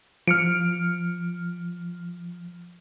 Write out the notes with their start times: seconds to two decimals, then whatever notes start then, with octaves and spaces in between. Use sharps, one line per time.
0.28 F3 F6 C#7 D7